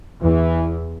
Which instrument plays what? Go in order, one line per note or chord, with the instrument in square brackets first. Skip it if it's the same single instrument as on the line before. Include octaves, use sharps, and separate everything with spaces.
[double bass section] E2 [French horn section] E3